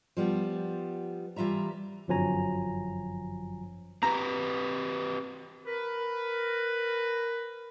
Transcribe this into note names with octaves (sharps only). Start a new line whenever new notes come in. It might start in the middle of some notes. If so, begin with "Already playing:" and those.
F3 G3 B3
E3 G3 F4 E5 A#5
G1 F#2 F3 F#3 G#5 A#5
C4 G4 B4 A#5
A#4 B4